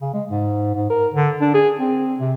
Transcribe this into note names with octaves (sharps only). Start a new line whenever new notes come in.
C#3
G#3
G#2
G#2
A#4
D3
D4
G#4
C4
C3